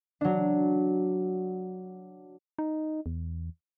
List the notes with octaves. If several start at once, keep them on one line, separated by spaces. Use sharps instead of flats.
F#3 D4
D#4
E2